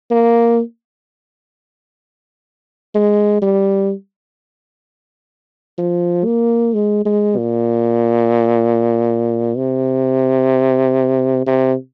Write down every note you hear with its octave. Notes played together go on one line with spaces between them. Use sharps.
A#3
G#3
G3
F3
A#3
G#3
G#3
A#2
C3
C3